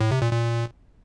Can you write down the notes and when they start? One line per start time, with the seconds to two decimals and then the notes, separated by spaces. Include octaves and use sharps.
0.01 A2
0.11 C3
0.22 A#2
0.33 A#2